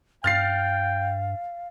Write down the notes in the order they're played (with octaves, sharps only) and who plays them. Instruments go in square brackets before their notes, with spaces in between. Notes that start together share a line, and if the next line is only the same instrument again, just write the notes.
[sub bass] G2 [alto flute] F5 [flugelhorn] G5 [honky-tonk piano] F6 A6 C7